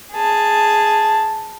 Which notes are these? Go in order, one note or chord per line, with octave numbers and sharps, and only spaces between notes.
G#4 A5